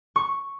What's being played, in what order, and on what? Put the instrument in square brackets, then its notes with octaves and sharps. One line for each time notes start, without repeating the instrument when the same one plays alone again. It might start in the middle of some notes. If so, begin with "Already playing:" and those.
[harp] C#6